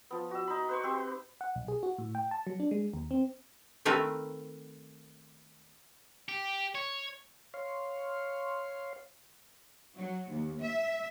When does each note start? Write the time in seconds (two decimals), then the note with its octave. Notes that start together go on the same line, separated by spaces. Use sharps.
0.11 F3 B3
0.31 F#4 E5
0.47 D#4 B5
0.69 B4 C5 C#6
0.83 C4 G4 B4
1.41 F#5
1.56 B1
1.68 G#4
1.83 F#4
1.98 A2
2.15 G5
2.31 A5
2.47 F#3
2.60 D4
2.71 G#3
2.94 D#2
3.11 C4
3.85 D#3 A3 C4 A#4 B4
6.28 G4
6.75 C#5
7.54 C#5 F5 C6
9.98 F#3
10.31 D#2
10.63 E5